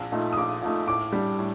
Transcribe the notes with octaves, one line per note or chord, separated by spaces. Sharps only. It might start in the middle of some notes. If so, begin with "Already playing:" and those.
Already playing: A#1
A#2 A3 D#4
D#6
A#1 D6
A#2 A3 D#4
A2 D6
G3 D4
A2